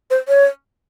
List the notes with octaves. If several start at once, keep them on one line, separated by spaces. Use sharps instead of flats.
C5
C#5